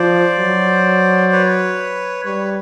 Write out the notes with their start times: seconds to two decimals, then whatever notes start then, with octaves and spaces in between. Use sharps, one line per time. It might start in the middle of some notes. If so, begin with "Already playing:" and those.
Already playing: F3 C5 D5
0.39 F#3
1.33 B4 C#5
2.25 G3 B4 C#5